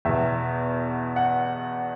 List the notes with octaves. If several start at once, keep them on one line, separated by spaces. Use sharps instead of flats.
E2 B2 E5
F#5